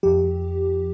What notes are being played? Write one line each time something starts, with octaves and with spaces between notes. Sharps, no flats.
F2 F3 G4